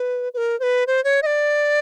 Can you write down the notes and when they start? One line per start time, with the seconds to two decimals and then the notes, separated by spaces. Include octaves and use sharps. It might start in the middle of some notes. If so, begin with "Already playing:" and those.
Already playing: B4
0.34 B4
0.37 A#4
0.60 C5
0.63 B4
0.87 C5
1.04 C#5
1.22 D#5
1.26 D5